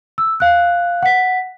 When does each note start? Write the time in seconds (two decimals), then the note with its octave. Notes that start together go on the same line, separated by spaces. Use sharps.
0.18 E6
0.40 F5 F#6
1.03 F#5 B6